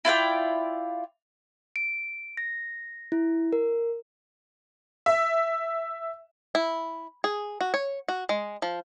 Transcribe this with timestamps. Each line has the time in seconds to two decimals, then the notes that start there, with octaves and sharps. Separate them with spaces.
0.05 E4 F4 D5 G5
1.76 D7
2.37 A#6
3.12 E4
3.53 A#4
5.06 E5
6.55 E4
7.24 G#4
7.61 F#4
7.74 C#5
8.08 F#4
8.29 G#3
8.62 F3